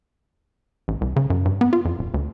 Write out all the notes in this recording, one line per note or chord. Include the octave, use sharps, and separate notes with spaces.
A1
C2
C#3
F#2
G2
B3
F4
F2
D#1
D2